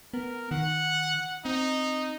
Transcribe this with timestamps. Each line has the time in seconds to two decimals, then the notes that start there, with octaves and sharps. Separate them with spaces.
0.14 B3 A#4
0.51 D#3 F#5
1.45 C4 D#4